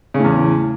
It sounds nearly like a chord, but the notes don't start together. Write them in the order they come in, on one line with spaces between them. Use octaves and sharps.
C#3 A2 E2